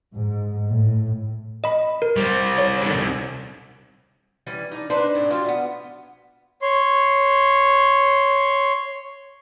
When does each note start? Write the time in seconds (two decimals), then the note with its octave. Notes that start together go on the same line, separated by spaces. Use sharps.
0.13 G#2
0.69 A2
1.64 D#5 B5
2.02 A#4
2.17 G3 C4
2.58 C#5
2.82 D3 D#3
2.96 C2
4.47 E3 G3 C#4
4.72 D4 D#4
4.90 D4 D#4 B4 C5
5.15 A2 C4
5.30 F#3 G3 F4 G4
5.45 A3 B3
6.62 C#5 C6